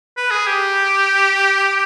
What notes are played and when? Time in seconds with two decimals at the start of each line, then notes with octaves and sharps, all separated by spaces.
0.17 B4
0.31 G#4
0.46 G4